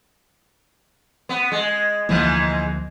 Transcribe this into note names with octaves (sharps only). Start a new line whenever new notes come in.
B3
G#3
D2 G#2 E3 F3 G#3 A#3